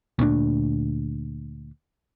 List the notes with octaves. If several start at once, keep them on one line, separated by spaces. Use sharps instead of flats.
D2 A#2 C#4 D4